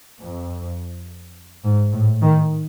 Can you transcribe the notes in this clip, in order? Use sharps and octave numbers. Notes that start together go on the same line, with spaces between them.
F2
G#2
A2
D#3